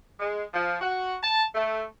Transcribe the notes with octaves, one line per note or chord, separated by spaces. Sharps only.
G#3
F3
F#4
A5
A3